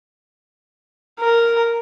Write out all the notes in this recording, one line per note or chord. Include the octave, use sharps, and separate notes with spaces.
A#4